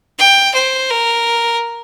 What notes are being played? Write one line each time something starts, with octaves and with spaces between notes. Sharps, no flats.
G5
C5
A#4